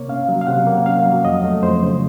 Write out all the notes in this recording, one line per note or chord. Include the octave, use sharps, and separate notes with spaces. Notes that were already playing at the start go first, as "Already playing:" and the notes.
Already playing: C3 A#3 C#5
C#4 F5
F#3
F5
C3 F#5
A#3
C#4 F5
F#3
F2 D#5
A3
F2 C5
C#3